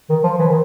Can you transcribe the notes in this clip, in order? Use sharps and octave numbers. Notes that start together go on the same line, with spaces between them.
D#3
F3
E3
D#3